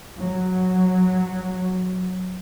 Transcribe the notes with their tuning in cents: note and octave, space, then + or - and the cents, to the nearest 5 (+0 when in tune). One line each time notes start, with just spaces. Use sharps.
F#3 -10